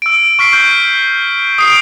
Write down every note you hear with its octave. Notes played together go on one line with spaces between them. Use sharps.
E6 D7
C#6 F6 B6 C7 D7
F6 G6
D#6 C7 D7